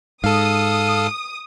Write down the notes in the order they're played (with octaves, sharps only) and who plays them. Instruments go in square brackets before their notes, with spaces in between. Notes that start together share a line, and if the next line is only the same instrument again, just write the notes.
[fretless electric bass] G#2 [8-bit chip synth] A4 F5 [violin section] D#6